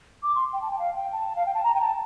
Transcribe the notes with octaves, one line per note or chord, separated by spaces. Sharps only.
D6
C6
G5
A5
G5
F5
G5
A5
F5
G5
A5
A#5
G5
A5